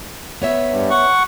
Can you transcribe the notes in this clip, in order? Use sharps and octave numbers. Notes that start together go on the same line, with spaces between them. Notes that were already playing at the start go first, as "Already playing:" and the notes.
B3 C#5 E5
G2
F#5 C#6